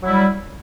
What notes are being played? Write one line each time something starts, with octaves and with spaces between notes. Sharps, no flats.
F#3 G3 E4